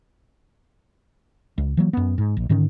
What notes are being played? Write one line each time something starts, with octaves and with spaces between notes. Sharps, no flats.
C#2
E3 F#3 A#3
F#2 B3
G#2
A#1
G#2 D3 D#3 C#4